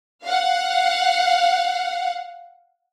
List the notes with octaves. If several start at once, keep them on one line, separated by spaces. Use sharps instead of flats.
F5 F#5